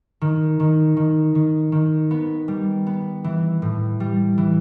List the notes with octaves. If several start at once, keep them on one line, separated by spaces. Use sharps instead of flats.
D#3
D#3
D#3
D#3
D#3
B3
G3
B3
E3
A2
G3
E3